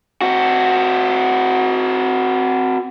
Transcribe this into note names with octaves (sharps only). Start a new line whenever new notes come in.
C4 F#4